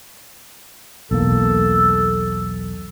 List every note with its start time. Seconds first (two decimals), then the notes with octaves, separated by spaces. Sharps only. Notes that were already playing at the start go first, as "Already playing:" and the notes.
1.11 B1 E2 A#3 A4